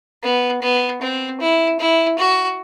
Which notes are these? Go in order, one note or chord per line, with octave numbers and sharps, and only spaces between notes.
B3
B3
C4
E4
E4
F#4